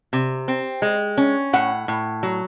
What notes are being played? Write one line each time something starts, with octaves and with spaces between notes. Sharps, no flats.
C3
C4
G#3
C#4
A2 F#5
A2
F#3